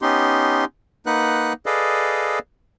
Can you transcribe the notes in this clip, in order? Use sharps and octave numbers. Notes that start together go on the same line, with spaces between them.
B3 C#4 D#4 G4 C6
A#3 D#4 B4 F#5 F#6
G#4 A4 B4 D5 D#5 F5